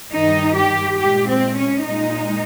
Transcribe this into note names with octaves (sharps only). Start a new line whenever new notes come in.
G2 D#3 G3 D#4
G4
A#2 G#3 G4
C4
C#4
A#2 G#3 D#4